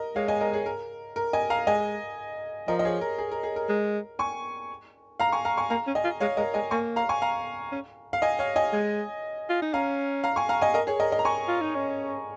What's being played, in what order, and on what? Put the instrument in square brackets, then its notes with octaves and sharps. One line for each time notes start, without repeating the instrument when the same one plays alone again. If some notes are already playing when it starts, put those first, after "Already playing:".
Already playing: [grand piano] A#4 D#5
[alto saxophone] G#3 [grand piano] C#5 F5
[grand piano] D#5 G#5
A#4 D#5
G#4 C#5
A#4
A#4
D#5 G#5
F5 A#5
[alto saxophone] G#3 [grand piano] D#5 G#5
[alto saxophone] F3 [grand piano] A#4 D#5
[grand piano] D#5
G#4 C#5
A#4
G#4
A#4
G#4
A#4
[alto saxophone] G#3
[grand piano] G#5 C#6
F5 A#5
G#5 C#6
F5 A#5
G#5 C#6
[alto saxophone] A#3 [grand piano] F5 A#5
[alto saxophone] C#4
[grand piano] D#5 G#5
[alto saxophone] F4
[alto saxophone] G#3 [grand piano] C#5 F5
[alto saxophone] G#3 [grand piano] A#4 D#5
[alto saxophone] G#3 [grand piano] D#5 G#5
[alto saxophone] A#3 [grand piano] G#5 C#6
[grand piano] F5 A#5
G#5 C#6
F5 A#5
[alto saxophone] C#4
[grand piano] F5
D#5 G#5
C#5 F5
D#5 G#5
[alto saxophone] G#3
F4
D#4
[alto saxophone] C#4 [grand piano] F5 A#5
[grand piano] F5 A#5
G#5 C#6
F5 A#5
D#5 G#5
A#4 D#5
G#4 C#5
A#4 D#5
A#4 D#5
A#5
G#5 C#6
[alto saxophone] F4
D#4
C#4